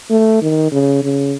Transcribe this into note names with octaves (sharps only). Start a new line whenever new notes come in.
A3
D#3
C#3
C#3